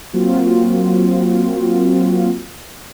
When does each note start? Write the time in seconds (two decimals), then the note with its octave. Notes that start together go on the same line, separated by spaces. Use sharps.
0.13 F#3 A#3 C4 F4 F#4